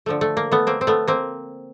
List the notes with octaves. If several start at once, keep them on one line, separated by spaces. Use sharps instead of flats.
D3 F3 A3
A3
A#3
A3 B3
A#3 C4
C4
A3 B3
A#3 C4